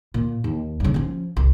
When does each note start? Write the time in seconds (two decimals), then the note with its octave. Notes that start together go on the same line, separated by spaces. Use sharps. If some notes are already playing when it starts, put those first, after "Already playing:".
0.14 A#2
0.44 D#2
0.80 G2 C#3
0.94 F3 C#4
1.37 C2